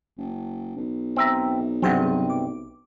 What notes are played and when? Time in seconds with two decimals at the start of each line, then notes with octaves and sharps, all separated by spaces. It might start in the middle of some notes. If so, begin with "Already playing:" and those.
0.18 F#1
0.77 B1
1.16 C4 E5 A#5
1.82 G2 C3 F#3 C4 G#4 F#5
2.30 D6